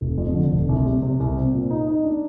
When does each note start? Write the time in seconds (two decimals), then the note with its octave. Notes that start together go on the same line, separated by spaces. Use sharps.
0.01 F1
0.18 F2
0.34 D3
0.51 F1
0.69 C2
0.85 C3
1.02 C3
1.20 C2
1.37 C4
1.53 A#2
1.70 D#4
1.87 D#4
2.04 D4